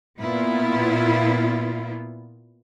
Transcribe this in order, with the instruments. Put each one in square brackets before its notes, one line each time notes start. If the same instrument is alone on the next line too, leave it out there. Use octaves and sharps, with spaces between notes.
[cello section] A#2 B3 E4 F4